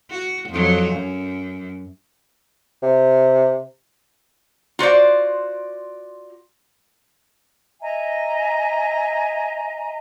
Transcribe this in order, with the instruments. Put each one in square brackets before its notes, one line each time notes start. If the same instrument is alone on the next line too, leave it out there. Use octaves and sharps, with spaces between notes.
[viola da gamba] F#4
F2 F#3
F#2
[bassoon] C3
[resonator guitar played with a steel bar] F4 F#4 C5 D5
[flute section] D#5 E5 G#5 A#5